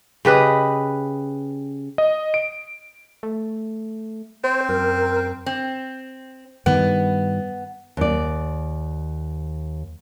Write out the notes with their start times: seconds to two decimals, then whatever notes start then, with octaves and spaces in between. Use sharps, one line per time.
0.25 C#3 G4 B4 D#5
1.98 D#5
2.34 D7
3.23 A3
4.44 C4 C5
4.69 F#2 A#4
5.46 C4
6.66 G2 D#3 B3
7.97 D#2 D5